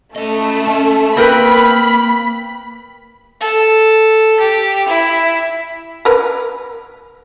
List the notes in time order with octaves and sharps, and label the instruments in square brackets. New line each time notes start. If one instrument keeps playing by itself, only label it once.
[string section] A3 [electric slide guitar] C#4 D#5
[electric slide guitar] C#4
[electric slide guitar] A#3 [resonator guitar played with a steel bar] C4 A#4 B4 [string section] B5
[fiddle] A4
G4
E4
[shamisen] A#4 B4